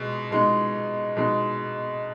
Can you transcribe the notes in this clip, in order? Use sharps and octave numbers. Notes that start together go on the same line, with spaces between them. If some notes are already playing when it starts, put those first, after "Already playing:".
Already playing: B2 G#3
B2 G#3 D#4
B2 G#3 D#4